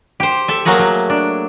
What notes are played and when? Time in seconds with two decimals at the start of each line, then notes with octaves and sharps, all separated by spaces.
0.20 G4 C5
0.48 A4 E5
0.65 F#3 A3 A#3 F#4 G#4
0.79 F#3
1.10 D4